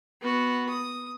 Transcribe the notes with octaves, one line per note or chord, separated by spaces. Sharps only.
B3 F#4
D#6